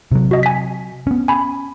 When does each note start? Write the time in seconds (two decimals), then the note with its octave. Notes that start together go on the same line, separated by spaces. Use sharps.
0.12 C3 F#3
0.31 F#4 D#5
0.43 G#5 B6
1.07 B3 C#4
1.28 G#5 B5